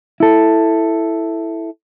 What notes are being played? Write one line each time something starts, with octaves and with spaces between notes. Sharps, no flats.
E4 A4